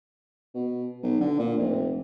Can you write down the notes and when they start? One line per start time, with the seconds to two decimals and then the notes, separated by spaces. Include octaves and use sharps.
0.54 B2
1.03 B1
1.20 D3
1.39 A#2
1.57 F1